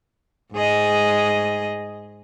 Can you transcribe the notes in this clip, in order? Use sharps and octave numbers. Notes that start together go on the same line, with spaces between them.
G#2 G#4 D#5